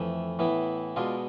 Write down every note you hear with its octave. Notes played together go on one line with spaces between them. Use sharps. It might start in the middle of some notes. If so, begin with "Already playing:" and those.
Already playing: F2 E3 A3
A2 E3 B3 E4
B2 G#3 D4 F4